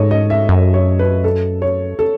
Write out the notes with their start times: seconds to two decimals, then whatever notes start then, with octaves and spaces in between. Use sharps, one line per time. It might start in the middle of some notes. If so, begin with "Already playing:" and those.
Already playing: G#2 A4 C#5 D#5
0.11 D#5
0.30 E5
0.49 F#2
0.74 C#5
0.99 B4
1.24 A4
1.62 C#5
1.99 A4